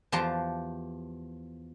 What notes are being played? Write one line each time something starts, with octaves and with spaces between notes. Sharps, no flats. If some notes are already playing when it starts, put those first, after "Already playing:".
E2 F3 G4 A5 A#5 C6